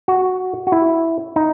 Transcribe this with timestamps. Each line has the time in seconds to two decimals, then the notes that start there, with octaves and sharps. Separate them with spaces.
0.08 F#4
0.67 F#4
0.72 E4
1.36 D#4